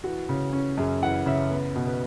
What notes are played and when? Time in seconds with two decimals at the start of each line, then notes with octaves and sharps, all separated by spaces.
0.04 E3 F#4
0.29 C#3
0.53 C#4
0.77 F#2 G#4
1.02 E3 F#5
1.26 C#3 E5
1.51 B3
1.76 B2
1.87 B4